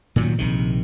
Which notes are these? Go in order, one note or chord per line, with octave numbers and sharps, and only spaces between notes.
A#2 D#3 F#3
A#1 C3 D#3